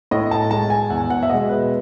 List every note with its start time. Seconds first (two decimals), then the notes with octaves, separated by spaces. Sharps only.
0.11 A2 D#5
0.31 A5
0.50 G#3 A5
0.70 G#5
0.90 E2 F#5
1.10 F#5
1.23 E5
1.29 B2 G#3 D#5
1.49 B4